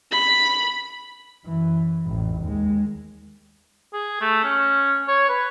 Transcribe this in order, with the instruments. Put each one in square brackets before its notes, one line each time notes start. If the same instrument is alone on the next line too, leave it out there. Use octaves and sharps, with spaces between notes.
[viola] B5
[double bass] F#2 E3
A1 F2
D#2 G#3
[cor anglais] G#4
A3
C#4
C#5
B4